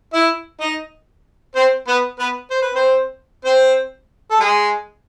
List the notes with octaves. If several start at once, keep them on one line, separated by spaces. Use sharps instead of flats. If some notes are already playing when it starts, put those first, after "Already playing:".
E4 E5
D#4 D#5
C4 C5
B3 B4
B3 B4
C5
B4
C4 C5
C4 C5
A4
G#3 G#4